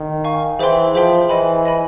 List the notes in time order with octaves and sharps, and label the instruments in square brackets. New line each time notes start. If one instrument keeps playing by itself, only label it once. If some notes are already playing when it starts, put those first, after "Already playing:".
Already playing: [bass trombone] D#3
[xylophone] F5 G#5 C#6
[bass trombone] E3 [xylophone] G#4 C5 E5 G5 C6
[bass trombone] F3 [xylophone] G#4 C5 E5 G5 C6
[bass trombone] E3 [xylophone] D#5 G#5 B5
[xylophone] D#5 G#5 B5